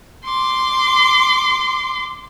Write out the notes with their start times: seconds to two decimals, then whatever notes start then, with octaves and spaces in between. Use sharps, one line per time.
0.25 C6 D6